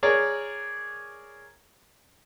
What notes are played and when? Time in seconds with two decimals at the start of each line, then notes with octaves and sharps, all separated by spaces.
0.03 G#4 A#4 C#5 D5